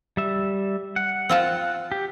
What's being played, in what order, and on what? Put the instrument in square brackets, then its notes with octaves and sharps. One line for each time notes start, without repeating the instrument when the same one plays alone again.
[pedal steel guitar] G3 E5
F#5
[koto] C4 F4 A5
[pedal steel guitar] G4